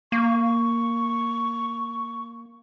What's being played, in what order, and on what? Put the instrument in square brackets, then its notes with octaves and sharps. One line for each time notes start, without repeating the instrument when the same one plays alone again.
[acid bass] A#3 [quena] C#6